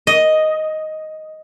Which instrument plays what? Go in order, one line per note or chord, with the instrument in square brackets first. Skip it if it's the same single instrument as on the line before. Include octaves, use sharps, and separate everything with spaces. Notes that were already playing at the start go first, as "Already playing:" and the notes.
[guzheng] D#5